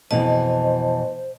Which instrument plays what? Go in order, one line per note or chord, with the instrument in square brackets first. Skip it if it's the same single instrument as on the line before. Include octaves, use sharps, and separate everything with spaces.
[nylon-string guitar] F2 B2 E3 [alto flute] C5 [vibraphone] D#5 A5